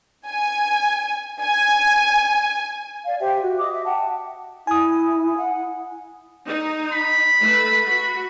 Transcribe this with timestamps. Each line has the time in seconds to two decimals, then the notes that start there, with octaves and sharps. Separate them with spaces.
0.27 G#5
1.41 G#5
3.06 D5 F5
3.21 G4 C5 E5 G5
3.42 F#4
3.59 D#5 D6 D#6
3.73 E5
3.86 F#5 G5 A5
4.67 E4 G#5 D#6
5.38 F#5
6.48 D#4
6.92 B5
7.41 A3 B4
7.86 F#4